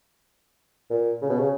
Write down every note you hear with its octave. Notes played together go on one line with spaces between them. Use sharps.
A#2
C#3
B2
C#3